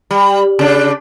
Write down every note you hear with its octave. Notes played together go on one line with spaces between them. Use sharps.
G3
C#3 D4